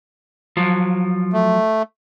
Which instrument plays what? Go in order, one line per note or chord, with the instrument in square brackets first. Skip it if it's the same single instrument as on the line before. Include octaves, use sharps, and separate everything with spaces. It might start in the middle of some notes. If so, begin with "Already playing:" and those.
[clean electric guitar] F3 F#3
[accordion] A3